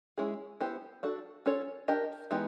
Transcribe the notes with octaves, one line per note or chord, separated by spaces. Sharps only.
G#3 C#4 E4 G#4
B3 E4 G4 C5
D4 F#4 A4
C#4 F4 A4 C#5
D4 G4 A#4 D#5
E3 G#3 B3 D#4 G4